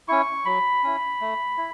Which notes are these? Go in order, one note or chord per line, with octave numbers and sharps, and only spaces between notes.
C#4 E4 C#6
F#3 B5
C#4 E4
A3
E4